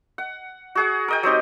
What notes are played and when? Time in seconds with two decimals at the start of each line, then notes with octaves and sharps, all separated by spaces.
0.18 F#5
0.75 F#4 G#4 F#5
1.08 A#4 D#5 G5
1.23 F#3 C4 D#4 G4